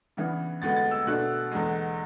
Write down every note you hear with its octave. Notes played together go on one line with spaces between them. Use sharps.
C#3 E3 B3 D4
D2 D3 G#3 B3 A6
A6
E6
B2 A3 D4 F#6
E2 D3 G#3